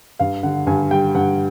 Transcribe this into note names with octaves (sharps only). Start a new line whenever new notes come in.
G2 F5
D3 F#5
G2 G#5
G3 G5
G2 F#5